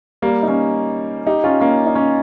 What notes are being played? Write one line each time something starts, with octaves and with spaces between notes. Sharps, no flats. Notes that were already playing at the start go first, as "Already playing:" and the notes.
G3 A#3
D#4
A#3 C#4
D#4 G4
C#4 F4
A#3 C#4
D#4
A#3 C#4